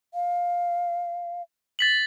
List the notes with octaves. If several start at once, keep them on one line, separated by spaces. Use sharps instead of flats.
F5
A6 B6 F#7